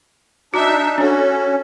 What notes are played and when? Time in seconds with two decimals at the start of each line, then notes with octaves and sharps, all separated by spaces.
0.54 D4 D#4 F#4 E5
0.98 C#4 D4 F#4 A4